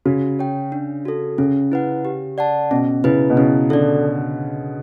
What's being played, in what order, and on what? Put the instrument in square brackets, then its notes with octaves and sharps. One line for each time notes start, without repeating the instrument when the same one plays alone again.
[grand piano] C#3 [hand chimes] F#4
[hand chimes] C#5 G5
D4
F#4 A4
[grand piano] C#3 [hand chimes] C#4
[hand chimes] E4 B4 F#5
G4
D5 F#5 A5
[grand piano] B2 [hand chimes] C#4
[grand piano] C#3 [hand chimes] E4 B4
[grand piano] B2
[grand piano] C#3 [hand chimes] E4
[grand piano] D3 [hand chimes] A4 D5